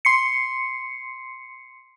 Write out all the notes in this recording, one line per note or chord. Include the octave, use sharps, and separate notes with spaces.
C6 C7 C#7